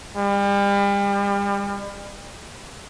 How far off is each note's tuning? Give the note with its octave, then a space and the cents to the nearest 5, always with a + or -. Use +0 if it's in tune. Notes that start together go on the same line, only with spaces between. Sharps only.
G3 +40